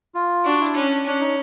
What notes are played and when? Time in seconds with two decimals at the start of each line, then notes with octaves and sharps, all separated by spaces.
0.15 F4
0.45 D4 F#4
0.60 E4
0.75 C#4 D4
0.91 D4
1.06 C#4 D4
1.20 D#4